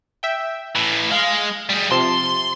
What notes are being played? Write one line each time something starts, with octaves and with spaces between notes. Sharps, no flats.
E5 G5
A2 E3
G#3 F5
G3 G#4
C3 F3 A5 C6